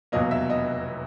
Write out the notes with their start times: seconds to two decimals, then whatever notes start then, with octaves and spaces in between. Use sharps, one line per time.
0.12 F1 E2 B2 F#3 A#3 D#5
0.31 E5
0.50 D#5